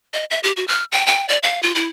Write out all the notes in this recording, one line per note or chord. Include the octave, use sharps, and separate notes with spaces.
D#5
E5
G4
F#4
F6
G5
G5
D5
F5
F4
E4